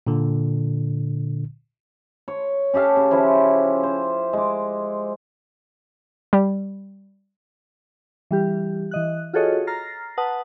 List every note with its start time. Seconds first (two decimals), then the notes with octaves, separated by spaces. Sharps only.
0.07 A#2 D3
2.28 C#5
2.74 C#4 G4 A4 F5
2.97 C#3
3.11 F3 C#4 E4
3.83 C5
4.33 G#3 D6
6.33 G3
8.31 E3 G3 G4
8.91 E3 D#5 F#6
9.33 F4 F#4 G#4 A4 C#5 D#5
9.67 A#5 F6 A6 A#6 C7
10.17 B4 F#5 A5 D#6